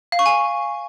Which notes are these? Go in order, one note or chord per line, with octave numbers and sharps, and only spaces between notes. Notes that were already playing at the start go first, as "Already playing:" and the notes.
F5
C#6
G#5